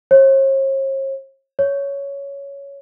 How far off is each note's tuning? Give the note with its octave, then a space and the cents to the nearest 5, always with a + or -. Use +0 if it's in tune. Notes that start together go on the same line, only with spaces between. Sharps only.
C#5 -45
C#5 +10